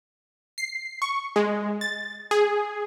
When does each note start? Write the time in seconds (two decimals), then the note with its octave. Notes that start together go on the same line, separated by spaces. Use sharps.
0.58 C7
1.02 C#6
1.36 G#3
1.81 A6
2.31 G#4